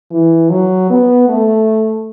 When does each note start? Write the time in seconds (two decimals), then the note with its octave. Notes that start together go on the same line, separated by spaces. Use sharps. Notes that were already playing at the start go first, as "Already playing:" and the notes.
0.11 E3
0.50 F#3
0.90 B3
1.29 A3